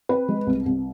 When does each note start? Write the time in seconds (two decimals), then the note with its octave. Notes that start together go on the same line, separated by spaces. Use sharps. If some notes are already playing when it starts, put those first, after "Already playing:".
0.09 C4 B4
0.28 G#3
0.47 C2
0.66 C2